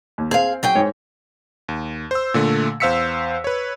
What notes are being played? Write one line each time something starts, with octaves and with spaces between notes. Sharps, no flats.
D#2
C4 G#4 F5
F#3 G#4 G5
G#2 G#3 C#5
D#2
C5 E6
A#2 D3 A3
E2 C5 F5 E6 B6 C#7
B4 C#5